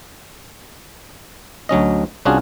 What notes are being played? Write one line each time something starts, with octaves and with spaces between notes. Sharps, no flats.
D2 F#3 C#4 D#5
C2 C#4 D4 F4 F#4 G#4